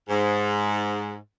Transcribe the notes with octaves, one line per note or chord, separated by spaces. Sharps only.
G#2